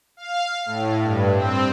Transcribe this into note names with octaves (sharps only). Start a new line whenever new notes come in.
F5
A2
G2
C4